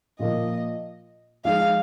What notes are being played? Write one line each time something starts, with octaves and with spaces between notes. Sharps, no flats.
A#2 F3 A#3 F4 D#5
F3 G#3 D#4 G#4 F5